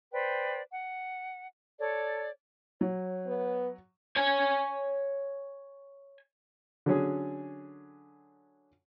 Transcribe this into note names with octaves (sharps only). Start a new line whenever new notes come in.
B4 C5 D5 G5
F#5
A4 C#5 D5
F#3 C#5
B3
C#5 G#5
D3 F#3 C#4 G#4